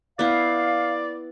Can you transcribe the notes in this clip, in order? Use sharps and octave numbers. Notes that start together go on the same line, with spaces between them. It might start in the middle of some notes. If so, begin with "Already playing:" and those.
B3 E4 D5 F5